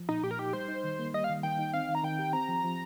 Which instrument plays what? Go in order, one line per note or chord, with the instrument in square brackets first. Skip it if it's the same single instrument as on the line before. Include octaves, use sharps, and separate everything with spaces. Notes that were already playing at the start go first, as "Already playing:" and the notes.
Already playing: [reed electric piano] F3
[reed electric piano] A#2 [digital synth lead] D#4
[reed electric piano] A#2 [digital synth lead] G4
[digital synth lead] A#4
[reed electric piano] D#4 [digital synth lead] G4
[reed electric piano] G3 [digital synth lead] C5
[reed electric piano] D#4
D#3
A#3
[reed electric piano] G3 [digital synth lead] D#5
[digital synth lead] F5
[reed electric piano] D#3
[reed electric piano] D#3 [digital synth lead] G5
[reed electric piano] D#4
[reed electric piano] C4 [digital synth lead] F5
[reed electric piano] D#3
[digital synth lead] A#5
[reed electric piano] D#3 [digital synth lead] G5
[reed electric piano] G4
[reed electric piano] C4 [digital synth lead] A#5
[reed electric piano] F3
F3